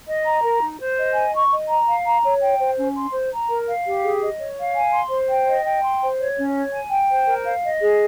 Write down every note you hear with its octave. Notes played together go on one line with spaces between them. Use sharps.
D#5
A#5
A#4
D#4
C5
D#5
G#5
C#6
D#5
A#5
F5
A#5
C#5
G5
C5
C#4
C6
C5
A#5
A#4
F5
G4
G#4
D#5
C#5
F5
G#5
C6
C5
G5
D#5
G5
C6
C5
C#5
C#4
C#5
G#5
G5
C5
A#4
F5
D#5
G#4